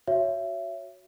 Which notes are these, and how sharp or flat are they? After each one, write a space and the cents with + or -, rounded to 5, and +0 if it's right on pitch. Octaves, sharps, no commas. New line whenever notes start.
F#4 +0 C#5 +0 E5 +25